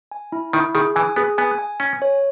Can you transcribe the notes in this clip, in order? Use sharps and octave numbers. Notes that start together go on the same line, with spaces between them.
G#5
E4
D#3 E4
D#3 G#4
E3 G#5
B3 G#4
B3 G#5
G#5
C#4 G#5
C#5